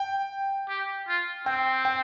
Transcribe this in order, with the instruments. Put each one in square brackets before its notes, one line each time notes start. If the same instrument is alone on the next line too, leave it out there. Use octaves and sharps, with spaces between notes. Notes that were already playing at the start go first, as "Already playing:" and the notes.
Already playing: [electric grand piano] G5
[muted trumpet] G4
F4
[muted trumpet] C4 [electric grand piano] G5
[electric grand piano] G5